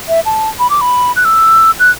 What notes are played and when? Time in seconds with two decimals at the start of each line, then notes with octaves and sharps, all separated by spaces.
0.09 E5
0.26 A5
0.59 B5
0.70 D6
0.81 B5
1.16 F#6
1.25 E6
1.80 F#6